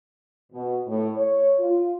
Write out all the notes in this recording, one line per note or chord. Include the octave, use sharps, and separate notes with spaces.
B2
A2
C#5
F4